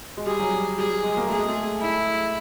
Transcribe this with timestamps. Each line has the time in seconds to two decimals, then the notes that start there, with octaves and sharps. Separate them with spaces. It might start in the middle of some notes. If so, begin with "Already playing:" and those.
0.17 G#3
0.26 G3 G#4
0.39 F#3
0.53 G3
0.78 G3 G#4
0.90 G3
1.04 G#3
1.17 A#3
1.27 A3 G#4
1.38 G#3
1.48 A3
1.81 E4